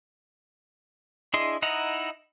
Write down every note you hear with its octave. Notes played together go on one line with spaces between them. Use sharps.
D4 E4 G#4 D#5 C6
D#4 E4 D#5 F#5 A#5